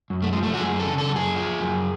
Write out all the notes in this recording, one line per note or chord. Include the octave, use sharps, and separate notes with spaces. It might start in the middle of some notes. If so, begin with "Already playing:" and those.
F#2
A3
F3 G#3
A3
F#4
F#2 G#4
A4
C#3
A4
F#2
G#4
F3
F#2